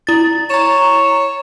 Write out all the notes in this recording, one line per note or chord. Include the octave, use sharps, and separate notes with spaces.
E4 A6
C#5 A#5 E7